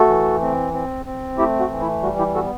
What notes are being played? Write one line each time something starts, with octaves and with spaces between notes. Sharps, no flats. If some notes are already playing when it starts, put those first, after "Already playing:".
Already playing: A3 F#4 A4
E3
C4
C4
C4
A3 E4 G4
F#4
E3
E4
G3 F#4
E4 G4
B3 F#4 A4